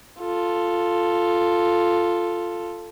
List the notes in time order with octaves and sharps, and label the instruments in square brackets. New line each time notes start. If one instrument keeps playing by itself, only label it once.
[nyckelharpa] F4 A4